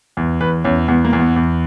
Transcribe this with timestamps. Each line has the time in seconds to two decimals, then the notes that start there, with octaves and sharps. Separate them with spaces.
0.17 E2
0.41 E2 B4
0.64 E2 C#4
0.88 E2 B3
1.05 A#3
1.13 E2
1.20 B3
1.36 E2